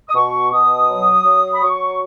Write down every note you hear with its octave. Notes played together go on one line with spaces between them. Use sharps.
D#6
B2 C#6
B2 D#6
F#3
F#3
B5
F#3 C#6